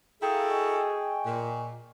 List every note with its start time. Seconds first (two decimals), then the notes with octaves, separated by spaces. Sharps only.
0.22 E4 F#4 G#4 A4 F5 G5 A#5
0.50 D#5 G#5 C#6
1.26 A#2